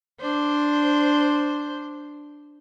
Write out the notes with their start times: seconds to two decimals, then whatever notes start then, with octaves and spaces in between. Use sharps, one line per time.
0.20 D4 C5